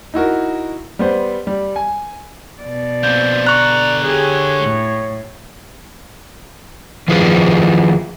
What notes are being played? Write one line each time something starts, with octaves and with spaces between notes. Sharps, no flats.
D#4 E4 F#4 A#4
G3 B3 C5
G3
G#5
B2 D5
A#3 C4 G6
D3 A#5 C#6 F#6
G4 G#4 C#5
A2
D#3 F3 F4 G#4 B4